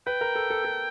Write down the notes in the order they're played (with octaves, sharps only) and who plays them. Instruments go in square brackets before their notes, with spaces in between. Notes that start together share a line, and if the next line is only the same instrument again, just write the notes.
[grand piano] B4 [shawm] G5
[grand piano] A#4
A4
A4
A4